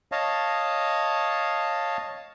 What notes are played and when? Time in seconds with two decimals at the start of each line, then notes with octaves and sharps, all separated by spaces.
0.12 C#5 D#5 F5 A5